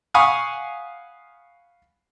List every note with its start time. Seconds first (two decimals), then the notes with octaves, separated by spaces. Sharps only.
0.14 F5 F#5 G#5 B5 C#6 D#6